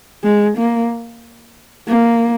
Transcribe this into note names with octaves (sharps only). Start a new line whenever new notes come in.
G#3
A#3
A#3